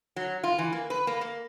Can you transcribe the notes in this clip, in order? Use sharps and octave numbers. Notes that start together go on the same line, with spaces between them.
F#3
F4
E3
A#3
B4
A#3
A#3